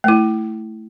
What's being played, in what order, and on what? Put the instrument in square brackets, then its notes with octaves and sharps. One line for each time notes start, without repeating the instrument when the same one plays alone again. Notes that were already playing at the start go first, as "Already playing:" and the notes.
[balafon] A3 E4